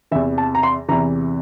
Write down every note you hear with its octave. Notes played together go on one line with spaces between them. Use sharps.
E2 C3 E3 E5
A5
A#5
C6
E2 C3 E3 A#5